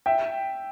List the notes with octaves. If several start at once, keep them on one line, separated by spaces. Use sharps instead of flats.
E5 G5